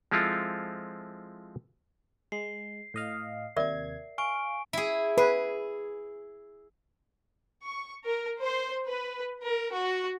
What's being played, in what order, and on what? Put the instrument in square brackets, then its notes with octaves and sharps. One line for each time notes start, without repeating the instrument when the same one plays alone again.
[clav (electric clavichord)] F3 G#3 C4 E4 F4 A4
[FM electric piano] G#3 [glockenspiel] C7
[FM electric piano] A2 D#5 F5
[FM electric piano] D#2 C3 G#6 [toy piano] A#4 D5 E5
[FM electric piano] F5 [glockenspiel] G#5 C#6 D7
[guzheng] E4 G#4
[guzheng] G#4 [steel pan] B4
[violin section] C#6
A#4
C5
B4
A#4
F#4